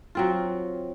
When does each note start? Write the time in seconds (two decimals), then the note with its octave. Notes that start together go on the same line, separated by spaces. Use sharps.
0.15 F#3 C4 F4